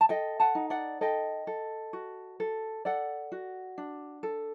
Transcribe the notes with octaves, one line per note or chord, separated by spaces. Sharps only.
A5
A4 D#5 G5
F#5 A5
D#4
D5 F#5
A4 D#5 G5
A4
F#4
A4
A4 D5 F#5
F#4
D4
A4